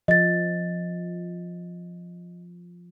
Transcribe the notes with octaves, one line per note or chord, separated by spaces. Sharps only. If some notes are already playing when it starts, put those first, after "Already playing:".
F3 D#5 A6